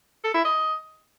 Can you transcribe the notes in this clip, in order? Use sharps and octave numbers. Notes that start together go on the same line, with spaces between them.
A4
E4
D#5